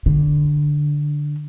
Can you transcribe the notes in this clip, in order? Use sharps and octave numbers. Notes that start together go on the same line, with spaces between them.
D3